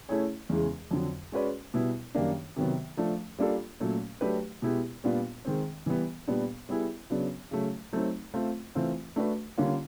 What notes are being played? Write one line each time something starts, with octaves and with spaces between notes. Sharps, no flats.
A3 C#4 E4 G#4 C#5
E2 C#3 E3 G#3
F2 D3 F#3
G#3 C#4 F#4 B4 D5
B2 G3 B3 E4
F#2 D#3 G3 A#3 D4
C3 D#3 F#3 B3
F3 A3 D4
G3 A#3 D4 F4 A4
A#2 F#3 A3 C#4
F#3 A3 D4 G4 B4
B2 G#3 B3 E4 G4
A#2 G3 B3 D4 F4
D#3 G#3 C4
E3 G3 B3
A#2 G3 B3 D4
G3 B3 E4 G#4
C#3 F#3 B3 D4
C#3 F#3 A3
F#3 A3 C4 D#4
A3 C4 F4
E3 A3 C4 F4
A3 D4 F#4 B4
D3 G3 A#3 C#4 F4